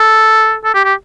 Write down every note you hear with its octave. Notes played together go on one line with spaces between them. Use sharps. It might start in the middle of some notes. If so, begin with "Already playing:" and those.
Already playing: A4
A4
G4
G4